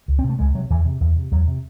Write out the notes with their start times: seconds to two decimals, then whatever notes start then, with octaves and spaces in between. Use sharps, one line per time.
0.08 C#2
0.19 C4
0.24 C3
0.29 A3
0.39 C#2 G#3
0.55 C3 F#3
0.70 E2 E3
0.85 C3
1.00 E2
1.16 C3
1.32 E2 F#3
1.47 C3